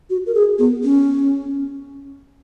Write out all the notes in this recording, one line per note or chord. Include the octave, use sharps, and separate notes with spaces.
F#4
A#4
G#4
B3
C#4